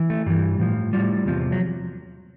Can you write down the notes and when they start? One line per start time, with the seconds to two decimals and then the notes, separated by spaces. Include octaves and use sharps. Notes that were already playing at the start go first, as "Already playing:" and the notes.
Already playing: E3
0.10 A3
0.26 G2 E3 G3
0.59 A2 F3
0.93 A2 F3 G3
1.26 E2 C3 F3
1.52 F#3